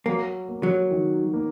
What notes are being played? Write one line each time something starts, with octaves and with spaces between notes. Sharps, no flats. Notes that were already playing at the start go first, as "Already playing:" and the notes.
F#3 A#3
A#3
F#3
D#3
A#3